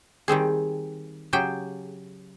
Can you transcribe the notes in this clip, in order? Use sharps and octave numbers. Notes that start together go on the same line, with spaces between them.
D#3 G3 C4 G#4
C#3 F#3 G4 G#4 G5